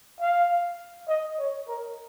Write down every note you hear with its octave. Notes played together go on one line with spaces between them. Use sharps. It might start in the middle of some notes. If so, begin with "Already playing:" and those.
F5
D#5
C#5
A#4